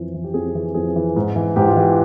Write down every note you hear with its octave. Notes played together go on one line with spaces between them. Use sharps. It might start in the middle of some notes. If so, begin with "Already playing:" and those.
Already playing: F2 E3
E3
G4
F2 G#4
E3
F2 G#4
E3
G#2
E3
G#2 G4
F4
E3 G4